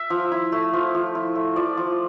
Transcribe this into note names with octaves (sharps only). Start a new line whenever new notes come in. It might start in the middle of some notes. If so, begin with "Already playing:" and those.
Already playing: E5
F3
E4
A3
F3
F3
E4
A3
F3 D5
F3